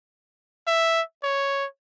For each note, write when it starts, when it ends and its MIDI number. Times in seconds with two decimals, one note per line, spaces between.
0.67 1.02 76
1.24 1.66 73